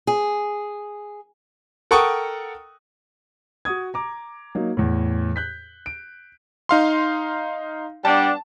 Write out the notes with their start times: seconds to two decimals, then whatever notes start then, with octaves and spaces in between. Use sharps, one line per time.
0.07 G#4
1.91 A4 A#4 F#5 G5 C#6 D#6
3.65 F#4 D#6 G#6
3.94 A#5 D6
4.55 F#3 A#3 D#4
4.77 E2 A2
5.36 F#6 G6 B6
5.86 D7
6.69 D#4 F5 C6
8.05 G3 B3 D4 A5